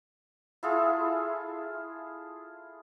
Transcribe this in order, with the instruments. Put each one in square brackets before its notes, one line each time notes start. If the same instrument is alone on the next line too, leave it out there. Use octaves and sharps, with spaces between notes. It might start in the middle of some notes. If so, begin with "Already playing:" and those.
[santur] E4 F4 G#4 A4